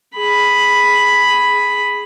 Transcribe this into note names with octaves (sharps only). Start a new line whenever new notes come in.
G#4 B5